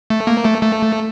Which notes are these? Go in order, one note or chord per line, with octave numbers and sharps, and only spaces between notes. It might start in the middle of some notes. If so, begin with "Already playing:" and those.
A3
A#3
A3
A3